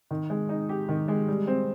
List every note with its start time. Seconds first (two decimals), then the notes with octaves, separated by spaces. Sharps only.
0.11 D#3
0.30 G#3
0.49 D#4
0.69 G4
0.89 D#3
1.08 G#3
1.28 G3
1.47 C4